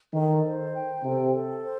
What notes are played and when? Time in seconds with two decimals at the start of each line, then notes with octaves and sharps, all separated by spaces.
0.13 D#3 A4
0.44 C5
0.74 G5
1.04 C3 A4
1.34 A4
1.64 C5